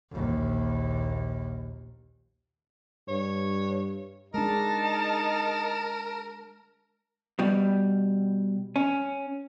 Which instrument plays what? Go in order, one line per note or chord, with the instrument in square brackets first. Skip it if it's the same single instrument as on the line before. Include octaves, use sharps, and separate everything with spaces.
[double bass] A#1 D#2
[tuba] G2 [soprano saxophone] C#5
[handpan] G#3 D4 [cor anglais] D#4 [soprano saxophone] A#4 [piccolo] A5
[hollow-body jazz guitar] B2 G3
C#4